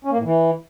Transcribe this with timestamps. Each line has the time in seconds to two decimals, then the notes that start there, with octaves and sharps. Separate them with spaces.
0.05 C#4
0.11 A#3
0.18 A2
0.25 E3